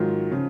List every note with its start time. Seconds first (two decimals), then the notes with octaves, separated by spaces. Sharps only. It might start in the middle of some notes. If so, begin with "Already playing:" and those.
Already playing: G#2 D#3 F#3 F4
0.31 C#3 F3